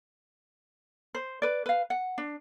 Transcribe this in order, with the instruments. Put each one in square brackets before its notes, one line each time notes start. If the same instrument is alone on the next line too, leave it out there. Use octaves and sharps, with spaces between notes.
[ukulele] C5
B4 D5
B4 F5
F#5
D4